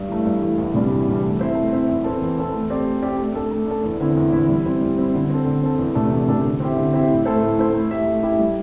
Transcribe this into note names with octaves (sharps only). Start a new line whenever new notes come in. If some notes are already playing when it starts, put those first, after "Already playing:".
Already playing: G2
E3 A3
G2
E3 A3
E2
C3 G3 D4
E2
C3 G3 D4
A3
C4 E4 C5 E5
A3
C4 E4 C5 E5
E2
E3 C4 A4
E2
E3 C4 A4
A3
C4 G4 D5
A3
C4 G4 D5
A3
D4 A4
A3
D4 A4
E2
D3 C4 E4
E2
D3 C4 E4
G3
C4 E4
G3
C4 E4
D3
C4 A4
D3
C4 A4
E2
C3 A3 D4 A4
E2
C3 A3 D4 A4
D3
C4 E4 G4 E5
D3
C4 E4 G4 E5
A2
A3 E4 A4 C5
A2
A3 E4 A4 C5
A3
E4 G4 E5
A3
E4 G4 E5
G3